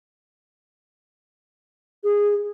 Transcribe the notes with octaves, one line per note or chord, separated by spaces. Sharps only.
G#4